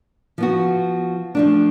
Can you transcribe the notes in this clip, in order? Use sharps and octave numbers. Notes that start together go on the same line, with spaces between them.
F3 B3 F#4
F3 A3 D4